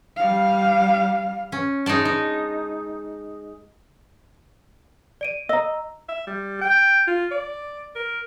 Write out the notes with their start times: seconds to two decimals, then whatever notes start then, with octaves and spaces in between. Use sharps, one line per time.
0.16 G3 F5
1.52 C#4
1.86 G#3 D#4 C#5 D5 A5
2.05 D#4
5.21 D5 D7 D#7
5.49 D#5 A#5 E6
6.09 E5
6.27 G3
6.62 G5
7.08 F4
7.31 D5
7.96 A#4